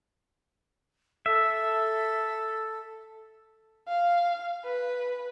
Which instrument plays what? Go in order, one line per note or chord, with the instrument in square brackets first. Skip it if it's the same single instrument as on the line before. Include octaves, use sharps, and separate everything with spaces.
[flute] A4 [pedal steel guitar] E5
[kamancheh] F5
B4